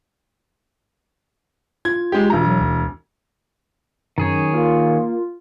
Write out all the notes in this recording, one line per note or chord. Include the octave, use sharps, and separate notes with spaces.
F4 G#6
G#3 G4
E1 A#5
F#3
D#2
F#2 D#3 G#4 C#5
A#3 F4